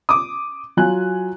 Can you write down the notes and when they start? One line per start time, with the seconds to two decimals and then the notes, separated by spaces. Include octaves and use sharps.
0.09 D6 D#6
0.77 F#3 F4 G#5 F#6